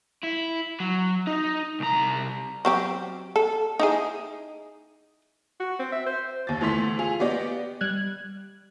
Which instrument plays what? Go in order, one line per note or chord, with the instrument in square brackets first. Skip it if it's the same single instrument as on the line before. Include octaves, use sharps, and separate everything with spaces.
[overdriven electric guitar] E4
F#3
D#4
C2 A#5
[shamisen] F#3 C4 G4
A4
D#4 E4 G#4
[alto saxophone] F#4
C4
E5
C5
[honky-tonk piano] D#2 A6
D2 E3 A3 C6 B6
F4 G#4 F7
A#3 B3 G4 D5 D#5
[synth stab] G3 F#6 G#6